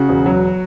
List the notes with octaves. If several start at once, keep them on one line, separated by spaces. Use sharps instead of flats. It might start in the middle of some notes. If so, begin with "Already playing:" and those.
Already playing: C#3 F#4
E1
F#3